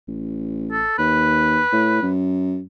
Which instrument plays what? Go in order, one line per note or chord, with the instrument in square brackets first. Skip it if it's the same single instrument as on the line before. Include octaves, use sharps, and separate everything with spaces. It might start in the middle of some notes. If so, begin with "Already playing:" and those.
[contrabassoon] A1
[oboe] A4
[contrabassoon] D#2 [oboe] B4
[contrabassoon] A2
F#2